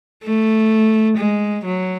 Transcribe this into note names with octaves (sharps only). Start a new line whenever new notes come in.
A3
G#3
F#3